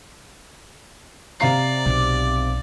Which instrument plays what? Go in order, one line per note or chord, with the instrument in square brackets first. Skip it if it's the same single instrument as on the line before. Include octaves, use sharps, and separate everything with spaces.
[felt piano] C3 F5 C7 [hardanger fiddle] D5 [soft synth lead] A#5
[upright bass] B1 [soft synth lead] D6